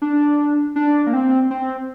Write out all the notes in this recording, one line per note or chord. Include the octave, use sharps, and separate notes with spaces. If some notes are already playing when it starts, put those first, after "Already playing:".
D4
D4
A#3
C4
C4